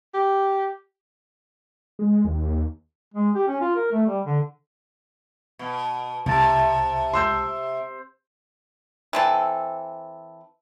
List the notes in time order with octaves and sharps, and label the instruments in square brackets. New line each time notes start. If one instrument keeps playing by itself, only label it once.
[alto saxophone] G4
[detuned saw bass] G#3
D#2
[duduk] G#3
G4
C#4
F4
A#4
A3
G3
D3
[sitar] B2
[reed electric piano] C2 A5 [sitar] C3
[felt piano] C6 E6 G6
[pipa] E3 C4 A4